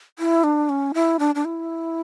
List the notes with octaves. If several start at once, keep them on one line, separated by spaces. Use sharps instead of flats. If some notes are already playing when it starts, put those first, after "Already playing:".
E4
D4
C#4
E4
D4
D4
E4